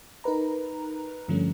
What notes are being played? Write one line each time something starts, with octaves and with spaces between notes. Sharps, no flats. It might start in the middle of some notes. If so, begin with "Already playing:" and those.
D#4 A#4 B4 A#5
G2 D3 F3 G3 A3 C#4